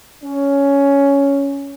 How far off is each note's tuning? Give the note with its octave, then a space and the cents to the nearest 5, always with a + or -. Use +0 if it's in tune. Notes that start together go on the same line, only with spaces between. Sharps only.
C#4 +10